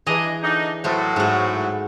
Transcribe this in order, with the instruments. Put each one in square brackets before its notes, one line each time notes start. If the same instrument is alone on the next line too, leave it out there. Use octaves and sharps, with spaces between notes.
[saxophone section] G2 D4 D#5 [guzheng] E3 G#4 A#5
[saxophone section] D3 D4 D#4
[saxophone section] A2 F#3 [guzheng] A3 C5
[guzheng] G#2 F#4